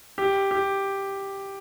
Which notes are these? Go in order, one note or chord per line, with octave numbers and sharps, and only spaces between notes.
G4
G4